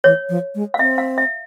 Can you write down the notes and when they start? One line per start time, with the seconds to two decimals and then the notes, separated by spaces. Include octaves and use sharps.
0.04 E3 C#5
0.29 F3
0.55 G#3
0.74 F5
0.79 C4 E5
0.98 F5
1.18 E5